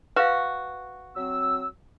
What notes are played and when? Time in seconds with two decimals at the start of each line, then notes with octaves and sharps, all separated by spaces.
0.16 F#4 B4 F5
1.15 F#3 C4 E6